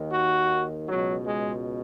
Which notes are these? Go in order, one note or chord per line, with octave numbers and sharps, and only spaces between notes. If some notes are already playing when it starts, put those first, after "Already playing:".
Already playing: D#2 D#3
F#4
C#2 B2 F#3
G#3